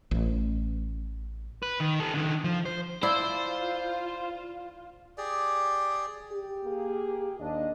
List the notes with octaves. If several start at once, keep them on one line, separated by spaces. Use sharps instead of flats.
A1
B4
D#3
G4 A4
D3 D#3
F3
C5
E4 F4 C5 D5 A5 E6
G4 G#4 D5
G4
A#3 G#4
D#2 D4 D#5